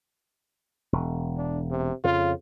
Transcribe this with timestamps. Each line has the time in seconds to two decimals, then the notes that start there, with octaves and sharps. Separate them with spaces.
0.93 E1
1.37 D4
1.70 C3
2.04 F2 C#3 F4